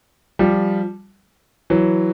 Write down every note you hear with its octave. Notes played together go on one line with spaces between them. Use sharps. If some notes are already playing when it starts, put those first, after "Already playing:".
F3 G3
E3 F#3